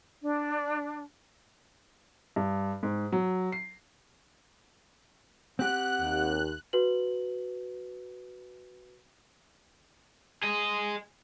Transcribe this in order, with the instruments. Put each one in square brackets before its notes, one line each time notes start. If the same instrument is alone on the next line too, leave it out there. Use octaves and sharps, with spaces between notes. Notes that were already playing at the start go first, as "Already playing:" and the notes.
[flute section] D4
[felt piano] G2
G#2
F#3
C7
[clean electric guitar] C4 G4 [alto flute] F#5 [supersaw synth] F#6
[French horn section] D#2
[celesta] F#4 B4 F#7
[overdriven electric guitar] G#4 D#5